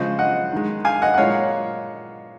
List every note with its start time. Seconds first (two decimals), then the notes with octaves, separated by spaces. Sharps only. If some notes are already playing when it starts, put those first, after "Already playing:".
Already playing: C#3 F3 G#3 C5 D#5
0.19 D#5 F#5
0.52 D#3 G#3
0.85 F5 G#5
1.02 D#5 F#5
1.14 F#5
1.18 A#2 G#3 C#5 F5